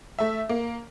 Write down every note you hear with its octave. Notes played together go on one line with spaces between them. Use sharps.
A3 E5
A#3